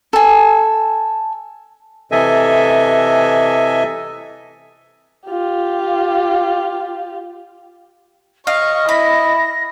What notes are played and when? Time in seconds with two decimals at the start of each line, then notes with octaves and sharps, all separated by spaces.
0.13 A4 G#5
2.12 C3 E3 A4 D#5 E5 G#5
5.27 F4 G4
8.47 D#5 F5 C#6 F6
8.89 E4 B5 A#6